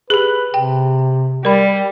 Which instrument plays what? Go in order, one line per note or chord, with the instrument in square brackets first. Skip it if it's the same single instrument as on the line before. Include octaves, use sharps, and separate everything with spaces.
[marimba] G4 G#4 [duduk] B4
[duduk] C3 [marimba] G5
[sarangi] G3 [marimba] A#4 B5